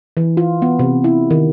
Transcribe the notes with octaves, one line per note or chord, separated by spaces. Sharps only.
E3
F4
B3
C3
E4
D#3